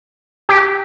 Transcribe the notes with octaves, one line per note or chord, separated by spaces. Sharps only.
G4